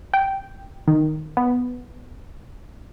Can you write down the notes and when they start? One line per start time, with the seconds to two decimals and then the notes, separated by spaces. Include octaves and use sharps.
0.14 G5
0.88 D#3
1.37 B3